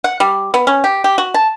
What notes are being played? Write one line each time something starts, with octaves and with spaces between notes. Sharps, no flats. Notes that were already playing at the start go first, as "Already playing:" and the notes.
F#5
G3
B3
C#4
G4
G4
F#4
A5